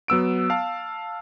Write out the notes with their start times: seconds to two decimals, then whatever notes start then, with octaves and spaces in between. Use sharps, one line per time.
0.08 F#3 B3 E6 D7
0.50 F5 A5